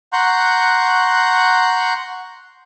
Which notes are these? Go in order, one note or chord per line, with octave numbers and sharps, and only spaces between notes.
F#5 A#5 C6 C#6 F#6 G6